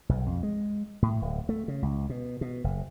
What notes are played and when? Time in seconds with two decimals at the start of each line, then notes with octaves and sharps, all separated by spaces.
0.09 B1
0.27 F2
0.43 G#3
1.02 A2
1.22 D1
1.49 A3
1.68 C#3
1.83 C#2
2.10 B2
2.41 B2
2.64 F#1